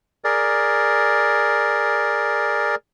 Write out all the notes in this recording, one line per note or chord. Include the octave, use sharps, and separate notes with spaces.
G#4 A#4 D5